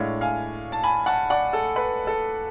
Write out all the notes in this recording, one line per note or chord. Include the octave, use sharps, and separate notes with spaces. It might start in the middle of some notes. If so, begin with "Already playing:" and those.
Already playing: A2 G#3 D4 C#5 F5
F5 G#5
A5
G#5 B5
F#5 A5
D5 F#5
A4
B4
A4